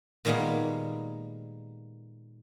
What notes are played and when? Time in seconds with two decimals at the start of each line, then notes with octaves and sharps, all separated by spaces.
0.25 A#2 D#3 G3 G#3 A#3 B3